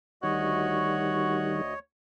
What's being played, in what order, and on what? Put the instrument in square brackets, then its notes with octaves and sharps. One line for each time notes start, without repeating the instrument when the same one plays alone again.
[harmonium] D2 D#5 [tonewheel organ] D#3 G3 [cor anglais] F#4 [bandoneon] C#5